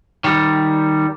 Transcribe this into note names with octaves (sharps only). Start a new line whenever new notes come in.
D#3 G3